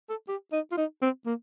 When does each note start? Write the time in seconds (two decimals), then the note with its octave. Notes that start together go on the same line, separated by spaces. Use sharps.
0.09 A4
0.28 G4
0.52 D#4
0.72 F4
0.77 D#4
1.02 C4
1.26 A#3